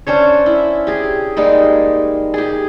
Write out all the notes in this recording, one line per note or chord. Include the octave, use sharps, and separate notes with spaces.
C#4 D4 C5 C#5
E4
G4 G#4
G3 G#3 A#3 D#4
G4 G#4